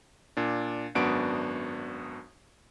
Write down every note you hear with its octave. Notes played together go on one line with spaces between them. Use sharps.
A#2 D4
G#1 F#2 B3 D4 F#4 D7